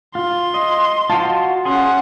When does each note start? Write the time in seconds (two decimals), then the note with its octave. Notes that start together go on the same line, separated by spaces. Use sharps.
0.15 F4 C6
0.54 D#5
1.10 F4 F#4 F5 A5
1.65 C#4 G#4 F#5 C6